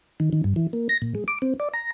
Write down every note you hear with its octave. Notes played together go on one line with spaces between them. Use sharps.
D#3
D#3
G2
E3
A#3
A#6
A#2
G#3
D6
C4
D5
A#5